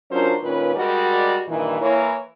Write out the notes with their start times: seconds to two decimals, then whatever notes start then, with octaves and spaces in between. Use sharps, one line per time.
0.10 F#3 C#4 D4 F4 A#4 C5
0.42 A#2 D#3 C#4 F4 B4
0.75 G3 G#3 F#4 A#4 D5 D#5
1.48 G2 A#2 D#3 E3
1.81 E3 A#3 E4 A#4 C#5